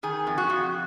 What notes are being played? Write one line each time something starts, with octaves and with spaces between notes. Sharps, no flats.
D#3 G#4
F2
F#4
F2